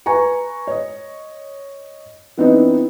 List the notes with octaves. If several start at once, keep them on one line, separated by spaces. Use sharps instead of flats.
B4 G#5 A#5 C#6
C#5 D#5
E3 B3 C4 D4 D#4